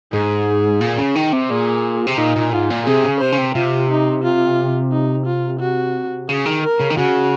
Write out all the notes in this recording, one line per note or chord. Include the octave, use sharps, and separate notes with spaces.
G#2 G#4
A#2
C#3
D#3
C3
A#2 G#4
C3
A#2 D#4
A#2
G#2 F4
A#2
C3 G#4
C#3
C3 C5
C#3
C3
C3 F4
D#4
F4
D#4
F4
F#4
C#3 G#4
D#3
A#4
C#3
D#3
C#3 F#4